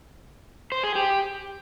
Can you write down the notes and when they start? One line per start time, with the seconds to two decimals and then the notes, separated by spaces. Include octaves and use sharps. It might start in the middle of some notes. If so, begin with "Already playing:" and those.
0.72 C5
0.84 G#4
0.95 G4